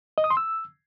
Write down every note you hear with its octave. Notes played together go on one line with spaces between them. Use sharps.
D#5
D#6
C6
E6